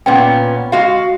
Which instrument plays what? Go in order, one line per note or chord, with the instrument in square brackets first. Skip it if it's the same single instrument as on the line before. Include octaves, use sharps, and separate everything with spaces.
[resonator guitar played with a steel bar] A#2 B3 C#4 [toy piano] G5
[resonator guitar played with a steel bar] G#3 F#4 F5